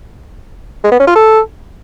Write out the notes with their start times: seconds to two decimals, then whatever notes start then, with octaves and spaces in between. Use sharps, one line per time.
0.84 G#3
0.92 B3
0.99 C#4
1.07 F4
1.15 A4